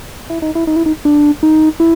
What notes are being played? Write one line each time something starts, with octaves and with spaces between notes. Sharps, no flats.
E4
D#4
E4
D#4
E4
D#4
D4
D#4
E4